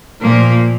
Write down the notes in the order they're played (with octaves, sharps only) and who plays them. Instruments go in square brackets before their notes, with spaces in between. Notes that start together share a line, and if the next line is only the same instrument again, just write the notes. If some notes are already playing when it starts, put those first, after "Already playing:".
[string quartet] A#2 F3 A#3